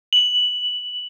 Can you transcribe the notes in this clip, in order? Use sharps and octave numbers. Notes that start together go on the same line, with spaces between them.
F#7